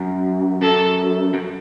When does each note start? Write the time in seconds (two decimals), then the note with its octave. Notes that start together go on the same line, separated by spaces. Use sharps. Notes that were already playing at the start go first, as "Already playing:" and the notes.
Already playing: F#2
0.62 F#2 A4
1.34 F#2